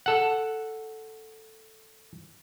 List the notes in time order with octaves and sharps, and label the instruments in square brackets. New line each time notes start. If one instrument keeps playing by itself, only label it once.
[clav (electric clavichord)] A4 F#5